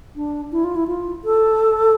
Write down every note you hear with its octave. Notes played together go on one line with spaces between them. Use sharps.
D4
E4
F4
E4
F4
A4